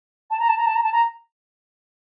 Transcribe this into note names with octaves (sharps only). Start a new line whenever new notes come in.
A5
A#5
A5
A#5
A5
A#5
A5
A#5